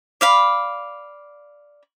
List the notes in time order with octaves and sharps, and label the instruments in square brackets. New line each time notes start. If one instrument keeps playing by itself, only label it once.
[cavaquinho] D5 F5 B5